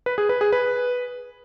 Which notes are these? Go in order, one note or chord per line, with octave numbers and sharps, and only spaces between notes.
B4
G#4
B4
G#4
B4